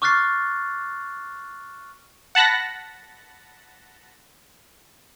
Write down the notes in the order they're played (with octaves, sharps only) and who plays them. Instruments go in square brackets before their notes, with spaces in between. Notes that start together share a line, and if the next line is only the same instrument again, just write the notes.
[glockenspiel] C#6 D6 F6 F#6 A6 C7
[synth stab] F#5 A5 B5 F#6 A#6